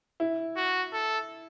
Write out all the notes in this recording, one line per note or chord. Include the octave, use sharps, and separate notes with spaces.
E4
F#4
A4